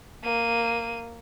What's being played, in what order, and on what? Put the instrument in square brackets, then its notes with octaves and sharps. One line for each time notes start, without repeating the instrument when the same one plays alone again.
[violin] A#3 D#7